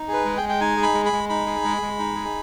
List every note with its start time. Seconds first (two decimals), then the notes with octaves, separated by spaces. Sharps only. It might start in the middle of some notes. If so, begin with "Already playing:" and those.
Already playing: D#4
0.08 G#4 B4
0.25 G#3
0.37 G5
0.42 G#3
0.49 G5
0.60 D#4 G#5
0.77 G#4
0.83 B5
0.94 G#3
1.06 B5
1.13 G#3
1.29 D#4 B5
1.46 G#4
1.64 G#3
1.82 G#3
1.99 D#4
2.16 G#4